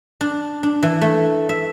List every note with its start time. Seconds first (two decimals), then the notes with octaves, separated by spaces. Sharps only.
0.21 D4
0.63 D4
0.83 E3
1.01 A3
1.49 E5